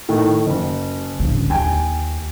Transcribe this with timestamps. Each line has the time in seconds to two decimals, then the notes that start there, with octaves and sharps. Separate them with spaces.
0.09 A2 D#3
0.46 F#1
1.20 A1 D3
1.50 D#2 G5 G#5